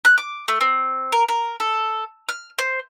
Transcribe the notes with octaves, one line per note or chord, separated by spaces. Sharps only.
F#6
D6
A3
C4
A#4
A#4
A4
F6
C5